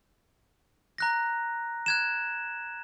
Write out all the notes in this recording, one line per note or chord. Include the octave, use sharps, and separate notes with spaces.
A#5 F#6 A#6
F#6 G#6 E7